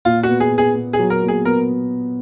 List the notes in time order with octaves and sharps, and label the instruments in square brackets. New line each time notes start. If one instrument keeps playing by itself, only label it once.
[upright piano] A#2 [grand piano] F4
[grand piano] F#4
[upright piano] B3
[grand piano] G#4
[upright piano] B3
[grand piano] G#4
[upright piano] B3
[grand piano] G#4
[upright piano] F#3
[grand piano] A#4
[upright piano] A#2
[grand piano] G#4
[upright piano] B3 [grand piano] A#4